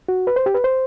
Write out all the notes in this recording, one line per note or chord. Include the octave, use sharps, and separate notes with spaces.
F#4
B4
C5
G4
B4
C5